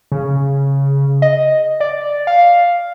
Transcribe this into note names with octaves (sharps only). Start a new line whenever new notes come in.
C#3
D#5
D5
F5